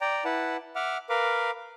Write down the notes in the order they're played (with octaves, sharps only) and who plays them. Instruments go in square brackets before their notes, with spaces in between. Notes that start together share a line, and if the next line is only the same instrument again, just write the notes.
[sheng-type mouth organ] D5 G5 A#5
E4 B4 F#5 A5
E5 F#5 D6 F6
A#4 B4 F5 D6